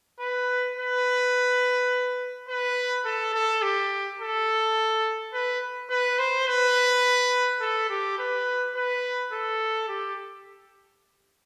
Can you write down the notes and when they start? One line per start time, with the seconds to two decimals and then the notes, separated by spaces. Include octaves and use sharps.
0.20 B4
0.77 B4
2.48 B4
3.05 A4
3.34 A4
3.62 G4
4.19 A4
5.33 B4
5.90 B4
6.19 C5
6.48 B4
7.61 A4
7.90 G4
8.18 B4
8.75 B4
9.32 A4
9.89 G4